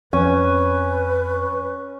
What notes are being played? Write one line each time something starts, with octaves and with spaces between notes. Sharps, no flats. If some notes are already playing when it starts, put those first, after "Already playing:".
F2 C#4 B4 G#5